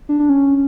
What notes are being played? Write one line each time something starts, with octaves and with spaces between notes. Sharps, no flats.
D4
D4
C#4